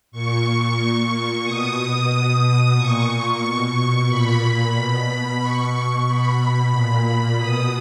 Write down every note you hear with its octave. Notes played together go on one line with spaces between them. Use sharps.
A#2 C#6
A#2
B2 D#6
B2
A#2 C#6
B2
A#2 B5
B2
B2 C#6
B2 B5
A#2
B2 D#6